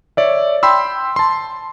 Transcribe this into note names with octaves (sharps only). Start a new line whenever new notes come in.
C#5 D5 E5
G5 B5 C6 E6
A5 C6